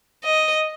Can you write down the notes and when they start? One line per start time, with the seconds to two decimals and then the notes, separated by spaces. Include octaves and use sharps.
0.24 D#5